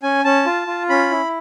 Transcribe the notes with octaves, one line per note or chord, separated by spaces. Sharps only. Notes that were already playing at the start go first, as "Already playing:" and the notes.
C#4 G#5
C#4 A5
F4
F4
C#4 B5
E4